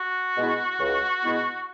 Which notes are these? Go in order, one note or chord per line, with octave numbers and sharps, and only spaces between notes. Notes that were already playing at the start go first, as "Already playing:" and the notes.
Already playing: F#4
B2 G#3 B3 E4
C#2
B2 G#3 B3 E4